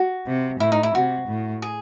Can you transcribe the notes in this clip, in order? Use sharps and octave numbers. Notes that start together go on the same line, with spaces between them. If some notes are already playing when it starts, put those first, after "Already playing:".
Already playing: F#4
C3
A2 E4
D#4
E4
C3 F#4
A2
G#4